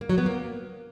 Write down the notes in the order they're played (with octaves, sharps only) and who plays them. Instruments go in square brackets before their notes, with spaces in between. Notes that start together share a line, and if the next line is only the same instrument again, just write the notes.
[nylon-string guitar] A#3
F#3
B3
A#3